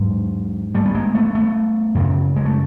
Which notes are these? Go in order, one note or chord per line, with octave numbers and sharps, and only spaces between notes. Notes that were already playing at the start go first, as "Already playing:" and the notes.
Already playing: G#2 F#3 G#3
G3 A3
B3
G#3 A#3
A3 B3
A3 B3
F#2 C#3
G#3
A3